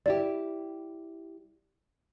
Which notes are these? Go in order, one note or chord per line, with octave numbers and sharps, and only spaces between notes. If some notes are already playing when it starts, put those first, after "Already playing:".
G3 E4 G4 D5